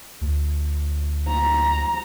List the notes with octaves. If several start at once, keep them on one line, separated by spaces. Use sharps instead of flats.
D2
A#5